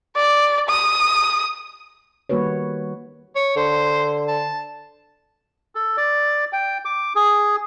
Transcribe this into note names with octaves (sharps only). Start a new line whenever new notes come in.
D5
D#6
D#3 G3 A#3 F#4 B4 C#5
C#5
D3 C5
A5
A4
D5
G5
D6
G#4